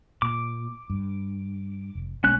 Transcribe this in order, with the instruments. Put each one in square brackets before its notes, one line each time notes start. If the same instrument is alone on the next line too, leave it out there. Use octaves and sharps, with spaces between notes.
[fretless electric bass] A#2 [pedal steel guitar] D6
[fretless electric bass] G2
F1
[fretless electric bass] B1 G#3 A3 [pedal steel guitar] C#4 F#6